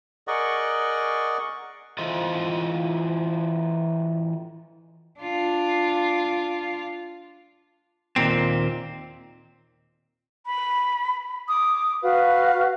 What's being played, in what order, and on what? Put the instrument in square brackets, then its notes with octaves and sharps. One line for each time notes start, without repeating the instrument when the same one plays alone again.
[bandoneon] G#4 A#4 D5 D#5 F#5 C#6
[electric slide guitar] E3 F4 A4 C5 D#5
[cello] D4 F4
[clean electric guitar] D#2 A#2 C4
[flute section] B5
D6 D#6
F#4 B4 F5